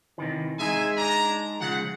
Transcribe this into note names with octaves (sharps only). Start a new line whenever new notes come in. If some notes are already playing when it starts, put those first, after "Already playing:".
C3 D#3 E3
G#3 D#4 G#4 E5 G#5
D4 A#5
C#3 F3 G#3 F#5